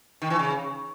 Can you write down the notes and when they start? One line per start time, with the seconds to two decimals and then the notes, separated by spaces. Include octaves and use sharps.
0.22 D#3
0.30 E3
0.39 C#3